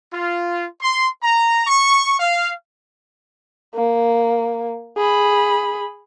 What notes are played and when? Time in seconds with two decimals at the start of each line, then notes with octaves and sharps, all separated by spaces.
0.12 F4
0.82 C6
1.23 A#5
1.67 C#6
2.18 F5
3.75 A#3
4.97 G#4 B5